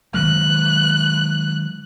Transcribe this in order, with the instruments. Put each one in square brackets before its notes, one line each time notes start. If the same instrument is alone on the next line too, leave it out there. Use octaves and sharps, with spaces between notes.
[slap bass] D#3 F#3 G#3 [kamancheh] F#6